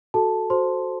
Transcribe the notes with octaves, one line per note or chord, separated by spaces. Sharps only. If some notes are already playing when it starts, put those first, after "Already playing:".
F#4 A4 A5
F#4 C5 C6